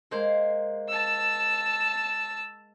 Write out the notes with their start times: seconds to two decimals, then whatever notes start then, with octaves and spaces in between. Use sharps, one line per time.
0.11 G#3 A#3 C5
0.89 A5 E6